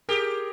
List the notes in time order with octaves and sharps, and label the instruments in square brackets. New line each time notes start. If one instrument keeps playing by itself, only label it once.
[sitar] G4 [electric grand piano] G#4 A#4